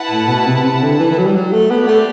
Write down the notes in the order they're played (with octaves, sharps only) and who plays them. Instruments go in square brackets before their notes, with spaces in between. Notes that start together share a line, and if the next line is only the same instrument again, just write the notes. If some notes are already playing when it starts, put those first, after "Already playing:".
Already playing: [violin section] E4 B4 F#5 A5
[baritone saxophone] A2
B2
C3
C3
D3
E3
E3
F#3
G3
F#3
A3
[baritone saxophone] B3 [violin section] C4 G4 D5 G5
[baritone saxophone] A3